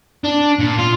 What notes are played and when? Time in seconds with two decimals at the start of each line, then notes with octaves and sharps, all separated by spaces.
0.24 D4
0.59 A#2
0.78 F4